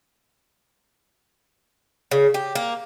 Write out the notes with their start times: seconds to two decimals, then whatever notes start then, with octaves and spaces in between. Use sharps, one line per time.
2.11 C#3
2.34 G4
2.55 A#3